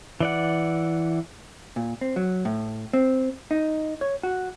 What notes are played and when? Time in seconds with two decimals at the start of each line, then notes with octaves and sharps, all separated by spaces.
0.20 E3 D5 F#5
1.76 A#2
2.01 C4
2.16 F#3
2.45 A2
2.93 C4
3.51 D#4
4.01 C#5
4.23 F#4